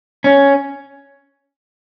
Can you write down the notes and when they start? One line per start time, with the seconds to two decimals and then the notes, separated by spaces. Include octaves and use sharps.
0.24 C#4